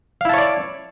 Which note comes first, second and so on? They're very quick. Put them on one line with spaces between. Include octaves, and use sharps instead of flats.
F5 E4 A5 C#5 D5